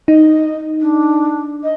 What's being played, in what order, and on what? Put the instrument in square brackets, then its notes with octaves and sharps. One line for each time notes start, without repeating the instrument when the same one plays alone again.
[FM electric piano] D#4 [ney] D#5
[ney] D4
D#5